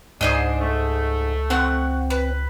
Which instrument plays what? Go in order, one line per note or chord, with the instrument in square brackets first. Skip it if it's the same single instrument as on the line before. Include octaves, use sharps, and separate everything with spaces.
[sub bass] C#2 [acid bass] G#2 [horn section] D4 [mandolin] G#4 C5 D#5
[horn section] A3
[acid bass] C4 [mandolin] F#4 F#5 C#6
[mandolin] B4